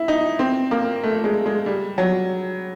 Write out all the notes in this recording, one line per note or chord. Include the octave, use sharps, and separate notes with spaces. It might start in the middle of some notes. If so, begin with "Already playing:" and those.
Already playing: E4
D#4
C4
A#3
A3
G#3
G#3
G3
F#3